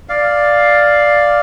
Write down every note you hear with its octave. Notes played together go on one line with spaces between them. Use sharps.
D5 F5